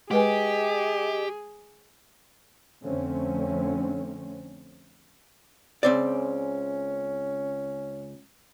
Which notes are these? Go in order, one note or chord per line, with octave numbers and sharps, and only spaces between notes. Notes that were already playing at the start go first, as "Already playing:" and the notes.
G#3 G4 G#4 B4 D#5 G#5
F2 D3 A3 C4 C#4
C#2 C4 C#4 D5